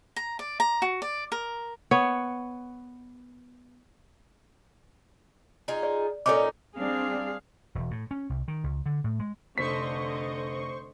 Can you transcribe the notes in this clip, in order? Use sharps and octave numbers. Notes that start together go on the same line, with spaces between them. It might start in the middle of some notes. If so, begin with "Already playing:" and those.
A#5
D5
A#5
F#4
D5
A#4
B3 C#5
D#4 F4 G#4
D5
A#2 C#4 D#4 A4 D6
G3 C4 D4 G#4 F5
E1
A2
C#4
C2
D#3
C#2
D3
A2
G#3
F1 D3 C5 D#5 C6 C#6 B6